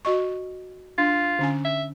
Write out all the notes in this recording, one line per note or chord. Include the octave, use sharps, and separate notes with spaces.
F#4 D#5 C#6
D4 F4
D3 C#4 G#5
E5